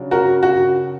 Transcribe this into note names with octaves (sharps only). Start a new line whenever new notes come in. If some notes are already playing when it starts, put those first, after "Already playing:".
Already playing: C#3 F#3 D4
F#4 A#4
F#4